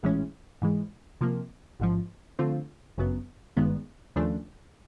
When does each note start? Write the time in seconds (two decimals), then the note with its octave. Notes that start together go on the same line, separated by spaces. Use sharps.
0.03 A#1 A2 E3 G#3 C#4
0.62 G#2 E3 G#3
1.21 C3 F3 A#3
1.80 A1 G#2 F3
2.39 D3 F3 A3 C4 F4
2.98 G1 F#2 C#3 F#3 B3
3.57 G#1 G2 D#3 G#3 B3
4.16 D#2 C#3 F3 A3 D4